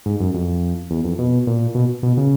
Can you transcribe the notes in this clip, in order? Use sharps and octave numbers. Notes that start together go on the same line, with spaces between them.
G#2
F#2
F2
E2
F2
B2
A#2
B2
B2
C#3